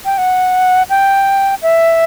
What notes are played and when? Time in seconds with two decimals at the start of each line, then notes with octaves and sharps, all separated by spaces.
0.05 G5
0.18 F#5
0.90 G5
1.62 E5